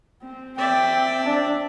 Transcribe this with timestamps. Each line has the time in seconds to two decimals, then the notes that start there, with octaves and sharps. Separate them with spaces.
0.22 C4
0.58 C4 D5 E5 G5
1.23 C4 D4